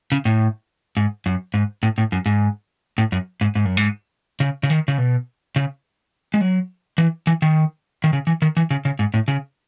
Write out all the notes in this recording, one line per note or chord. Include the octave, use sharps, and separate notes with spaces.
C#3
A2
G#2
F#2
G#2
A2
A2
F#2
G#2
A2
F#2
G#2
G#2
F#2
G#2
C#3
C#3
D#3
C#3
B2
C#3
G#3
F#3
E3
E3
D#3
D#3
C#3
E3
D#3
E3
C#3
C#3
G#2
A2
C#3